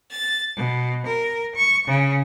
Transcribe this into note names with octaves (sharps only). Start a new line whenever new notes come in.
A6
B2
A#4
C#6
C#3